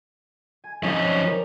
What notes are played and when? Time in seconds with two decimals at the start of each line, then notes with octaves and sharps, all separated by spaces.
0.64 G#5
0.83 F3 C4 C#4 D#4 C#5
1.04 C5 D5
1.23 F3 A#4